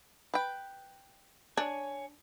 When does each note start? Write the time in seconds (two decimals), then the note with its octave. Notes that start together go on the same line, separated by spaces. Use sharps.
0.34 B4 G5
1.57 D4 C#5 G#5